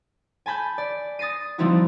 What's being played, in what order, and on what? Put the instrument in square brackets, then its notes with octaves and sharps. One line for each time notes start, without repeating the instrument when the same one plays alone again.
[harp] G#5 A5 B5 G6
D5
D#6 A6 A#6 C7 D#7
F3 G3 C4 D#4 E4 F#4